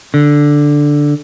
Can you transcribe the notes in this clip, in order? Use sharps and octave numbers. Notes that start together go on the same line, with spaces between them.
D3